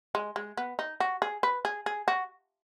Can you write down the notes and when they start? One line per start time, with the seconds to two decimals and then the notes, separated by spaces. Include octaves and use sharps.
0.15 G#3
0.36 G#3
0.57 B3
0.79 D#4
1.00 F#4
1.22 G#4
1.43 B4
1.65 G#4
1.86 G#4
2.08 F#4